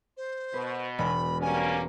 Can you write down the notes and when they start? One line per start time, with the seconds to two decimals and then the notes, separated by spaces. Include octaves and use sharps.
0.17 C5
0.54 B2 B4
0.99 E1 B5
1.41 G3 A#3 C#4 G#5